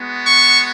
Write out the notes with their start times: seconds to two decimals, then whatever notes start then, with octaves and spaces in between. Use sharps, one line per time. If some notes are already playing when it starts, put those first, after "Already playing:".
Already playing: G#3 B3 F#4
0.27 C#6